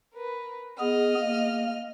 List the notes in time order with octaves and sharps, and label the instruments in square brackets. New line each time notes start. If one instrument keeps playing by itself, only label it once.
[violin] A#4 B4
[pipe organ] B3 G#4 [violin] D#5 F6
[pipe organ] A#3